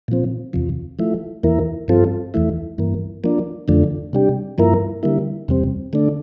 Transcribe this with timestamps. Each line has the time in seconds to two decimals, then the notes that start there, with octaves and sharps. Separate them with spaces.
0.08 A#2 F3 C4
0.53 E2 C3 F3
0.99 F3 A3 E4
1.43 E2 E3 A#3 E4 A#4
1.88 G2 F3 C4 F4 A4
2.34 E2 E3 A3 E4
2.78 G2 E3 A#3
3.24 F3 A#3 D4
3.68 F2 D3 F3 A3 D4
4.13 C3 G3 D4 G4
4.58 G2 F3 A#3 E4 A#4
5.03 D3 G3 A#3 E4
5.48 E2 C3 G3 C4
5.93 D3 A3 D4